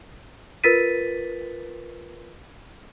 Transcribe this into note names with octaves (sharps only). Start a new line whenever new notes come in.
F4 A#4 B4 A6 B6 D#7